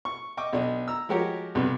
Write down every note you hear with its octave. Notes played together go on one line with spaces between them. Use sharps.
C#6
D#5 G5 C#6 D6
B1 D4 D#5
A#5 E6
F3 G#3 F#4 G4 A#4 C#5
B1 G2 C3